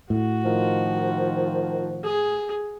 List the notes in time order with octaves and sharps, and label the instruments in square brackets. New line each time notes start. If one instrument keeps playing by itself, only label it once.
[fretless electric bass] A2 [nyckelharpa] F#4
[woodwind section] D#3 F3
[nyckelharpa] G#4